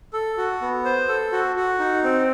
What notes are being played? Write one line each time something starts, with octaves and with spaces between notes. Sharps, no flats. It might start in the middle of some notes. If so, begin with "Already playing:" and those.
A4
F#4
B3
C5
A4
F#4
F#4
D#4
C4